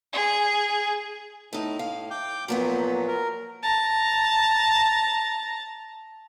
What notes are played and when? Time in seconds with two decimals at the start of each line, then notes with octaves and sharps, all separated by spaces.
0.13 G#4
1.53 A2 A3 D#4
1.79 F5
2.11 G5 D6 G6
2.48 A#2 F3 F#3 A#3 B3
3.08 A#4
3.63 A5 A#5